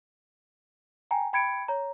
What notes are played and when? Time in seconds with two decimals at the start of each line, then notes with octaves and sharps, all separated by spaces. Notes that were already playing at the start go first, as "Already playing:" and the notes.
1.11 G5 G#5 A#5
1.33 G5 B5 G#6 C#7 D7
1.68 C#5 A#5